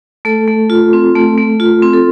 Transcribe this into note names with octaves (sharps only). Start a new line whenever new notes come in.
A3 A4
A3
F4
C4
A3
A3
F4
C4
A4